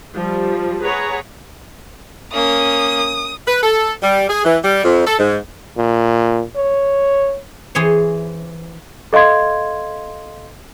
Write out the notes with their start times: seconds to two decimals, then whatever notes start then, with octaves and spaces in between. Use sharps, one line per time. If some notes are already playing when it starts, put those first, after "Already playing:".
0.14 F3 G3
0.83 G#4 B4 C#5 F#5 A#5
2.33 A#3 C#4 D#6
3.46 B4
3.62 A4
4.02 G3
4.29 G#4
4.44 E3
4.64 G3
4.84 F2
5.06 A4
5.18 G#2
5.77 A#2
6.56 C#5
7.75 E3 G#4 C5 C#5
9.13 A4 D#5 F5 C6 G#6